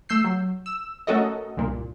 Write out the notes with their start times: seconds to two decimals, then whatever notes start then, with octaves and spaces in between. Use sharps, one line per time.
0.09 A3 E6 G6 C7
0.24 F#3
0.66 E6
1.07 A3 C#4 F#4 A4 A#4 D#5
1.57 C2 G2 A#2